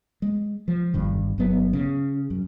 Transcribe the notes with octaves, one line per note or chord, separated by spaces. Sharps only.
G#3
F3
G1 E2 G2 D#3
G1 F#3 B3
C#3
F#2